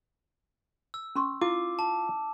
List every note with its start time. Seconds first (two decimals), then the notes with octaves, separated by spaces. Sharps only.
0.94 E6
1.16 C#4 C6 C#6
1.42 E4 F4 D6
1.79 A5